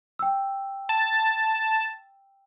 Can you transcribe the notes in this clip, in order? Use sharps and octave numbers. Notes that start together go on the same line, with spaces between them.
G5 E6
A5